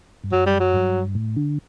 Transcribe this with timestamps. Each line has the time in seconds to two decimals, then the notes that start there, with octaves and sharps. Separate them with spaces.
0.24 G2
0.32 F#2 F#3
0.46 G3
0.60 F#3
0.73 G2
1.15 A2
1.36 D3